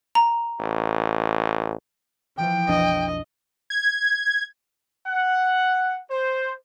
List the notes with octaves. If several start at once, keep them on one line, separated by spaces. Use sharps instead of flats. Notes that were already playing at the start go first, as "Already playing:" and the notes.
A#5
A1
E3 F3 G5
B1 F2 D4 D#5
G#6
F#5
C5